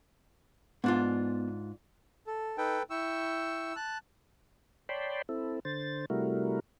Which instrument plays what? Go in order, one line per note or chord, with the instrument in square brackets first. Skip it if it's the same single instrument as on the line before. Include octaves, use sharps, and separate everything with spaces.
[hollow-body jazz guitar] G#2 D4 F4 [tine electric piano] B3
[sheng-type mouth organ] A4
[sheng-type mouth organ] D#4 [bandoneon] A4 B4 G5
[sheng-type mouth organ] E4 G5 C#6 [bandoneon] E6
[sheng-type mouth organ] A5 F#6
[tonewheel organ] C#5 D5 G5 A5 B5 C6
C4 E4 A4
D3 C5 A6
C3 G3 A3 E4 F#4 A#4